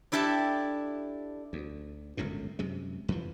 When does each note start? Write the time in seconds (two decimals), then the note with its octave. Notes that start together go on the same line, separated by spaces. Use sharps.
0.12 D4 E4 G4 A4 A5
1.53 D2
2.17 G1 C#2 F#2 A2
2.59 F#2 C3 G#3
3.08 F2 E3 F3